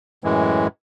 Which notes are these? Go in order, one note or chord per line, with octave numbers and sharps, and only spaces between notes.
F#2 A2 E3 G#3